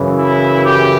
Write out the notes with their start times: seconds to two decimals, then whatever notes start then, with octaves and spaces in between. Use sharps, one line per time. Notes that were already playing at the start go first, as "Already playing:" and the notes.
Already playing: F#2 C#3 E3
0.19 E4
0.66 G4